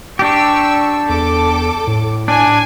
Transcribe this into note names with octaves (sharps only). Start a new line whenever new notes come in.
D4 G4 C#6 E6
E2 A4 D6
A2
D4 G#5